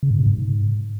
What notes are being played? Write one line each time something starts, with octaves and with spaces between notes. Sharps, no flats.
C#3
G#2
C3
G#2